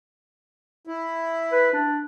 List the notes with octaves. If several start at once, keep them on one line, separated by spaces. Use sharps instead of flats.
E4
B4
D4